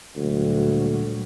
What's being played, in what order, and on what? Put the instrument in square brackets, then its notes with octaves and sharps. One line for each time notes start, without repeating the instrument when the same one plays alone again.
[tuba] D2 [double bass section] A#2 F#3 G3